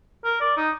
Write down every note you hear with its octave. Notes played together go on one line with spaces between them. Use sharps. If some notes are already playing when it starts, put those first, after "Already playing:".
A#4
D5
D#4